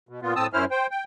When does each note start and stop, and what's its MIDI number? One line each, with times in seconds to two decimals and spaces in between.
0.09 0.20 47
0.22 0.34 46
0.22 0.34 59
0.22 0.34 65
0.36 0.47 45
0.36 0.47 60
0.36 0.47 81
0.36 0.47 87
0.36 0.47 88
0.53 0.65 42
0.53 0.65 61
0.53 0.65 64
0.53 0.65 72
0.53 0.65 89
0.71 0.87 72
0.71 0.87 79
0.91 1.04 79